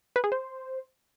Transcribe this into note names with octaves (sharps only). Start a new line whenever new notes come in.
B4
G#4
C5